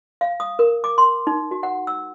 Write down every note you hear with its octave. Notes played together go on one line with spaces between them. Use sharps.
F5
D#6
A#4
D6
C6
D#4
F#4
F#5
E6